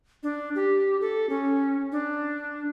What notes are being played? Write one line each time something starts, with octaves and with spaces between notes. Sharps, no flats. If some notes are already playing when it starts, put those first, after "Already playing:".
D4
G4
A4
C#4
D4